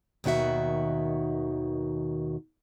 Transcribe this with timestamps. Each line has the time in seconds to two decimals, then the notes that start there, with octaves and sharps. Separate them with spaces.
0.24 D#2 B2 D#3 F#4 E5